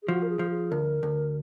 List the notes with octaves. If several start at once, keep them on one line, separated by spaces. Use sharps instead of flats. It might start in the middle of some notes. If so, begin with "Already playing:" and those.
G#4
F3 F#4
A#4
G#4
F3
G#4
D2 A#4
D2